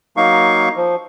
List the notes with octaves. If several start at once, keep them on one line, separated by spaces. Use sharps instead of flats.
F#3 A#3 D#4 F5 C#6
F3